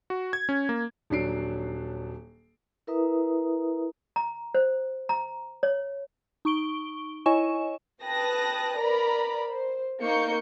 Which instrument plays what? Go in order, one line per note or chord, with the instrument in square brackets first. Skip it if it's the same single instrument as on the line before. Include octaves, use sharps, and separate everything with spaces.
[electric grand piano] F#4
G#6
C#4
A#3
[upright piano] D#1 F#3 D4 C7 D7
[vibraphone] E4 A#4 B4 E5 A#5 D#6
[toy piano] A#5
C5
A#5
C#5
[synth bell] D#4 C#6 D7 G7
E4 C#5 D#5 G#5 C#6 E7
[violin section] B4 G5 A5 D#6 F#6 A#6
A#4 B4 D5 A#5 B5
C5
A#3 D#4 C#6 G6 C#7